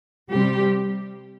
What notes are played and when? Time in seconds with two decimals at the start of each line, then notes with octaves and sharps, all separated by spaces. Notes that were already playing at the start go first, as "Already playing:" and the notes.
0.33 C3 G3 C4 G4